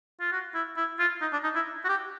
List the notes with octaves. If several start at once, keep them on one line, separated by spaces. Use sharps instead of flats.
F4
F#4
E4
E4
F4
D#4
D4
D#4
E4
F#4
G4